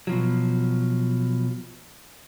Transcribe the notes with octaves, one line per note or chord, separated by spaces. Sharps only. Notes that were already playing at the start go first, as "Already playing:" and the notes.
B2 F3 F#3